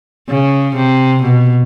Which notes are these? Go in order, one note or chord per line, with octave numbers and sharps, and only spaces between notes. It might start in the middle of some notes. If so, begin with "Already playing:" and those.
C#3
C3
B2